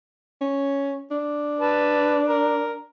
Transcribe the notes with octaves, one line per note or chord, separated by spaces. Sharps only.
C#4
D4
B4 A5
A#4